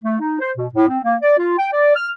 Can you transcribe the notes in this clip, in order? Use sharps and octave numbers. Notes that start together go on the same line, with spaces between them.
A3
D#4
C5
B2
A2
C4
A#3
D5
F4
G5
D5
F6